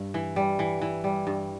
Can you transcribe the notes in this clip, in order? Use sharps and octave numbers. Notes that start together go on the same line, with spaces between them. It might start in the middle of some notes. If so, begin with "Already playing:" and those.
Already playing: G2
E3
G3
E3
E3
G3
G2